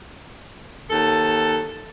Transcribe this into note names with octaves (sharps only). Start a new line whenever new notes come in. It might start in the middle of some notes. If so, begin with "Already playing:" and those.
D#2 A4